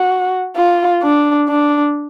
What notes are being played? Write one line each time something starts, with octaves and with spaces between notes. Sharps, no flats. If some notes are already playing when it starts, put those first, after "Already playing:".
Already playing: F#4
F4
D4
D4